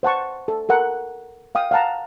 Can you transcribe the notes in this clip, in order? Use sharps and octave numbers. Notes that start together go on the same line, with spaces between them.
C5 F#5 A5 C#6
A4
A4 A#4 F#5
F5 G5 D#6
F5 F#5 A5 A#5